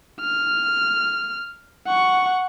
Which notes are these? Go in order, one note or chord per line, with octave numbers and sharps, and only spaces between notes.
F6
F#5 C#6